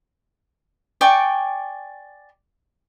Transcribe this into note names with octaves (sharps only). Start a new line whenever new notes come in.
D5 G5 G#5 C#6